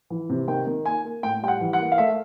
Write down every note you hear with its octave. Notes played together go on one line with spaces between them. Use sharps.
E3
C3
D#3 G5
D#3
A#3 G#5
A#3
A2 G5
G3 G5
F#5
E3
F#5
A#3
F5
A3 E5